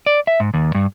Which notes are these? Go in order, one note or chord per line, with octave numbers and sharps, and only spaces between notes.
D5
E5
G#2
D#2
G2